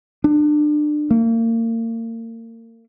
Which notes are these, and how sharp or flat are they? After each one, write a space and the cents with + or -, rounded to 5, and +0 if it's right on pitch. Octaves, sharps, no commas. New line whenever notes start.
D4 +30
A#3 -35